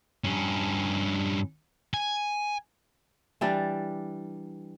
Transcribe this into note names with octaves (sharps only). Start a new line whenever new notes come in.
G2 C#4
G#5
E3 G3 D4